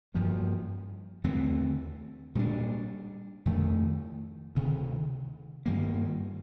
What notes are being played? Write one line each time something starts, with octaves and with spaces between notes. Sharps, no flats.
G2 F3 A#3
D#2 D3 A3 C4
A#2 G3 A#3 D4
F2 D#3 A3
D2 C3 D#3
G2 D#3 G3 A#3